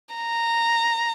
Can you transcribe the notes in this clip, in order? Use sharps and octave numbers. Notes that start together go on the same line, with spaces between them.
A#5